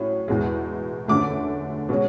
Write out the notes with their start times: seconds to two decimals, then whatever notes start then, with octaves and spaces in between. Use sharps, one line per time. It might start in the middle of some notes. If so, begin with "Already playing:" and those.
Already playing: A2 F#3 C#4
0.28 E2 B2 G#3
1.08 F#2 D3 A3 D6
1.89 B2 G#3 C#4